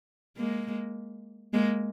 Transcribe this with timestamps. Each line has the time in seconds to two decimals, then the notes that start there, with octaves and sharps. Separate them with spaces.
0.37 G#3 A#3
1.54 G#3 A#3